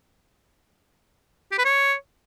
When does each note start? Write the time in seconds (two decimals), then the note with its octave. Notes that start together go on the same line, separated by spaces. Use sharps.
1.52 G4
1.58 B4
1.65 C#5